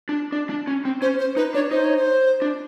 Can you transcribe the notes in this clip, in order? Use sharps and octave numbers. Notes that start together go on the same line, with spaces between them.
D4
D4
D4
C#4
C4
C#4 C5
C5
D#4 B4
D4 C#5
D#4 C5
C#5
C5
D4